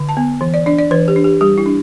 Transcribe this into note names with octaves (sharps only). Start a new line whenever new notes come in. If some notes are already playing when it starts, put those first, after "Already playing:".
Already playing: D3
A5
B3
E3
D5
D4 D5
D5
E3 B4
G4
D4
G4
G3 G4
E4
D4